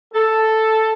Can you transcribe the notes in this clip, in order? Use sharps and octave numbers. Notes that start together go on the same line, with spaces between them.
A4